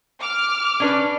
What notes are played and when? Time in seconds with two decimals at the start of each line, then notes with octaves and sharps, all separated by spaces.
0.21 D6 F6
0.80 C#4 D4 B4